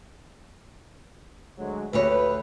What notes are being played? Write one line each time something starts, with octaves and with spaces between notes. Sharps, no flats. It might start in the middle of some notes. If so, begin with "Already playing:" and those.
D2 F#3 G#3
D2 G4 B4 C#5